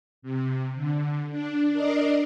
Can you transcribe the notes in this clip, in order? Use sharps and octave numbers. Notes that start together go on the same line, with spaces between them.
C3
D3
D4
D4 A#4 D5 D#5 C7